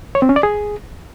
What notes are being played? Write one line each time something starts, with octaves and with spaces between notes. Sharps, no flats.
C#5
C4
C#4
D5
G#4